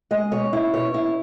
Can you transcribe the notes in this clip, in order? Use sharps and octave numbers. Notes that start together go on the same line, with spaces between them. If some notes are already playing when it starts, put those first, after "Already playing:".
G#3 D#5
B2 C#5
E4
B2 C#5
E4